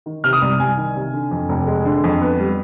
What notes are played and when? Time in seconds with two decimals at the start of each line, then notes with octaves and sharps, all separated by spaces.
0.06 D#3
0.24 C3 F6
0.33 D#6
0.42 C2
0.59 C2 G#5
0.78 D#3
0.96 C3
1.13 D3
1.31 F2
1.49 F1
1.67 G#3
1.85 D3
2.04 F2
2.22 B3
2.39 G3